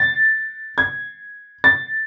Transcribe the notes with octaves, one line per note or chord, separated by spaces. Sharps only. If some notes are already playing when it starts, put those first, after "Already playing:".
Already playing: A6
G#6
A6